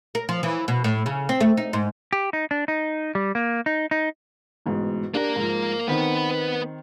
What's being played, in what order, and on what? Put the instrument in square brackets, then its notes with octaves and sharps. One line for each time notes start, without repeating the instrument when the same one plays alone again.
[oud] A#4
F3
E3
B2
A2
C#3
C4
A3
D#4
G#2
[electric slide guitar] G4
D#4
D4
D#4
G3
A#3
D#4
D#4
[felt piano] A1 G#2 B2
[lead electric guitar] A#3 A#4 [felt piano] D4 G4
[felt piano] G#2 F3
[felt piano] D#3 C4 D#4 [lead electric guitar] B3 B4